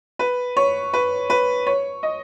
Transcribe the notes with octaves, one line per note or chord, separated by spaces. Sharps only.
B4
C#5
B4
B4
C#5
D#5